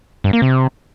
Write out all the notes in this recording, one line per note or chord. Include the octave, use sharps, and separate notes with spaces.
G2
A#3
C3